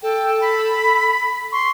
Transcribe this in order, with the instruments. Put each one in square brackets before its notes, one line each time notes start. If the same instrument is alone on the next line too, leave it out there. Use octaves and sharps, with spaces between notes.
[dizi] A4 [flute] G5
[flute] B5
[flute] C6 [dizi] C#6